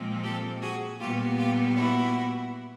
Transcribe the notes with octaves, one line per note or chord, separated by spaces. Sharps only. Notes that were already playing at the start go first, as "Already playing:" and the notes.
Already playing: A#2 F3 G#3 C4
G4 A4
F#4 G#4
A#2 G3 B3 F4 G4
F4 G4
E4 F#4